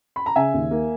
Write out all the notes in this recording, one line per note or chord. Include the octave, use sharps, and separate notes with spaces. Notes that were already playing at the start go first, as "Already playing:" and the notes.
B5
A#5
C#3 E5 G#5
D#2
A#3